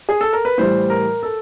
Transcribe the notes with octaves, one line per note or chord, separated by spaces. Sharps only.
G#4
A4
A#4
B4
A2 E3 G3 C5
A#4
A4